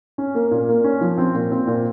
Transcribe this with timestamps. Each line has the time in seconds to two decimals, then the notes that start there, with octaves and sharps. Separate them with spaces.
0.18 C#4
0.35 A#3
0.51 A#2
0.69 A#3
0.84 C#4
1.01 F3
1.18 C4
1.35 A#2
1.51 C4
1.67 A#2